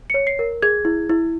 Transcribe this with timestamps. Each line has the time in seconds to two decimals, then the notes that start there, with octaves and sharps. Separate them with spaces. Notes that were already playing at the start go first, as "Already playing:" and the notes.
0.10 C#5 C#7
0.27 C7
0.39 A#4
0.62 G#4 G#6
0.85 E4
1.10 E4